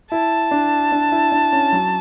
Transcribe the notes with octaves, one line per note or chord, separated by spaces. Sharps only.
E4 A5
D4
D4
E4
D4
C#4
F#3